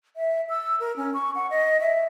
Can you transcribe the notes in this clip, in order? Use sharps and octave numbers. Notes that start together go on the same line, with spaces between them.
E5
E6
A#4
C#4
C#6
F#5
D#5
E5